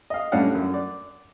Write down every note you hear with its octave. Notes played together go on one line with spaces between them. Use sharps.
D#5 F5
A2 G3 C#4 D4 F5 F#5
F#2
D5